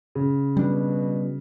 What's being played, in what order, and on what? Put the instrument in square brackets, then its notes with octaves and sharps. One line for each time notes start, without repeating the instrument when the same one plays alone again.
[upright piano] C#3
[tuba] B2 [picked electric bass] G3 D4